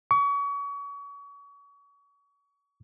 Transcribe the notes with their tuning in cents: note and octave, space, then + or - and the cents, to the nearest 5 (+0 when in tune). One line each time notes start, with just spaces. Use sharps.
C#6 +35